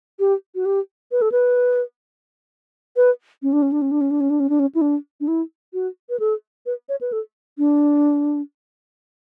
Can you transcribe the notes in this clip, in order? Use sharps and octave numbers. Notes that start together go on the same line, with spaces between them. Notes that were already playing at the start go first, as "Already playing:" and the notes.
G4
F#4
G4
B4
A4
B4
B4
C#4
D4
C#4
D4
C#4
D4
C#4
D4
C#4
D4
C#4
D4
C#4
E4
D4
D4
E4
F#4
B4
A4
B4
C#5
B4
A4
D4